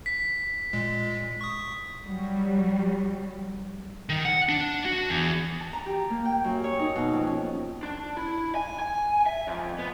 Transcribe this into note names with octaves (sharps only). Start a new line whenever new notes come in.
B6
A#2 G#3
C#6 D#6
F#3 G3
D#3
F#5
D4
F#4
E2
A5
A#5
G4
A#3
G5
F#2
C#5
D#4
B2
F2
C#4
D4
E4
G#5
G#5
E5
F2
B3